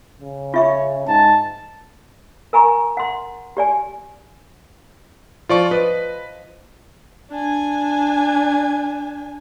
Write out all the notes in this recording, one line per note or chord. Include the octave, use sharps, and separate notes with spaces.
C#3
F4 C#5 E5 C#6
G#2 A5
A#4 G#5 A#5 C#6
F#5 C6
G4 D5 G#5
F3 F4 D5 C#6
B4 D#5
D4 G#5